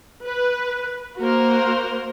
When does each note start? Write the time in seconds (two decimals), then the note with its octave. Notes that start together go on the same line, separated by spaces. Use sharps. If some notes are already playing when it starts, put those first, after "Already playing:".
0.24 B4
1.19 A#3 F#4 A#4 C5